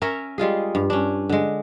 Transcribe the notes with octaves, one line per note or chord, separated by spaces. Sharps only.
C#4 A#4 C#5 E5
G3 G#3 F4 G#4
G2
C#4 D4
D3 G#3